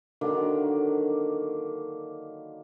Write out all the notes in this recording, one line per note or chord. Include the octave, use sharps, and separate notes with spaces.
D3 D#3 F#3 A#3